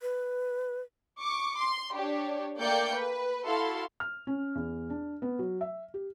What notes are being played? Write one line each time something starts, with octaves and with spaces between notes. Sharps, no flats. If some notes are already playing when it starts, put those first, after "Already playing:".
B4
C#6 D6
C6
D4 G4 C#5
A3 A#3 D5 G5 G6 C#7
B4
E4 F#4 A4 F5 C6
F6
C#4
E2
D4
B3
F#3
E5
G4